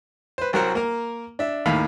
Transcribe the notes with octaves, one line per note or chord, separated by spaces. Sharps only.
B4 C5
C2 F#3 F#4 A#4 C5 F#5
A#3 A#4
D4 E5
D#2 A2 D#3 F5 B5